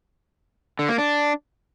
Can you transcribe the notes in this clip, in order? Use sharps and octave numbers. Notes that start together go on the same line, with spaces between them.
D3
A#3
D4